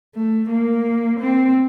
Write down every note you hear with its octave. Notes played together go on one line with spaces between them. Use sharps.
A3
A#3
C4